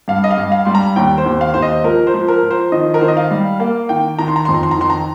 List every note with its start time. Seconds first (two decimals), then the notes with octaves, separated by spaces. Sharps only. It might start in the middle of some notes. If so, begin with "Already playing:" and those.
0.08 G2 F5
0.24 D#5
0.31 F5
0.38 G2
0.52 F5
0.65 G3 C6
0.75 A#5
0.96 D#2 G5
1.18 C5
1.26 D#2
1.41 F5
1.54 D#2 C5
1.62 D#5
1.84 F3 A#4
2.07 C5
2.14 F3
2.28 A#4
2.43 F3
2.51 C5
2.72 D#3 D#5
2.94 A#4
3.01 D#3 C5
3.08 D#5
3.17 F5
3.31 G3
3.60 A#3 F5
3.89 D#3 G5
4.19 D#3 A#5
4.28 C6
4.36 A#5
4.45 F2 C6
4.54 A#5
4.63 C6
4.71 A#5
4.77 D#3 C6
4.90 A#5